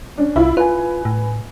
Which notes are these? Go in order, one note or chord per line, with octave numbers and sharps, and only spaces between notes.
C#4 D4
C2 E4 F4
F4 B4 G#5
A2